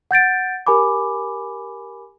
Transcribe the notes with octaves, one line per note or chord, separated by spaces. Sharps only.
F#5 G6 A6 D7
G4 A#4 G#5 B5 D6